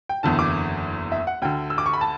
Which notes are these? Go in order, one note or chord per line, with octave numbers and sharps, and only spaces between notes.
G5
F#1 E2 D3 A5
D6
E5
F#5
D2 D3 G5
E6
D6
C#6
B5
A5